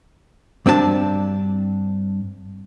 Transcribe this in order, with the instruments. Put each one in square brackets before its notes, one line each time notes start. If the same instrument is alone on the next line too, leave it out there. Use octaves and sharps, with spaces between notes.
[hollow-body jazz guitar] G2 C4 D4 F#4 A5